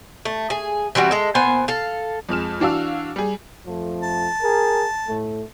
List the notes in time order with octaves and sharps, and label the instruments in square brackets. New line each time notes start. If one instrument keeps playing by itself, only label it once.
[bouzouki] A3
G#4
E3 G3 C4 F#4
G#3 A4
A#2 B3 C5 G#5
A4 F5
[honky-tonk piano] F2 G#3 F6 E7
E3 D4 F#4 F5 E6
G3 G#4
[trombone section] F2 F3 A3
[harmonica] A5
[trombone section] G#4 A#4
A2 A3